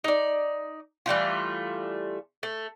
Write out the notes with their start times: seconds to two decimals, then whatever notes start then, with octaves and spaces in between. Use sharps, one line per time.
0.04 D#4 D5
1.06 E3 G3 A3 F4
2.43 A3